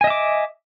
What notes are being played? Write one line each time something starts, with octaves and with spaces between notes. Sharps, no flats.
D#5 E5 G#5 D6